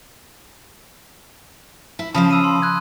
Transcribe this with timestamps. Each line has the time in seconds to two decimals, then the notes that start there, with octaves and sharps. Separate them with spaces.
1.99 E4
2.14 C#3 F3 C5 A5 B5 D#6
2.31 B5 E6 D#7
2.44 C6
2.62 F#6 G#6